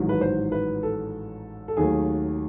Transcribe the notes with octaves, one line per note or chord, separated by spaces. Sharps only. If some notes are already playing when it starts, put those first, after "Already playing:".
Already playing: A1 G#2 D#3 F#3
B4
C5
B4
A4
A4
D#2 D#3 F#3 A3 G#4